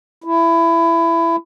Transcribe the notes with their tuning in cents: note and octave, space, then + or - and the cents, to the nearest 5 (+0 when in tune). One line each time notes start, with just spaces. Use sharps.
E4 +20